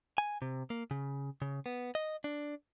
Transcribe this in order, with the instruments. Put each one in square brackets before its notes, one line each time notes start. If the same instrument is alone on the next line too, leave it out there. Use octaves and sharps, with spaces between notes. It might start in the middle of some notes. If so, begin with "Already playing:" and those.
[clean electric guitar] G#5
C3
A#3
C#3
C#3
B3
D#5
D4